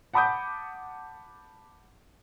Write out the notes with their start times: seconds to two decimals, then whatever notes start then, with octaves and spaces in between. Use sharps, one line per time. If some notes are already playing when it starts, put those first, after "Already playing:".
0.14 F#5 A5 B5 D6 D#6 G6